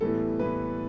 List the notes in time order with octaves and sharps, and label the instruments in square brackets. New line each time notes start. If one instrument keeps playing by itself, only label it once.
[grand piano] A2 E3 G3 B3 A4
A2 E3 G3 B3 B4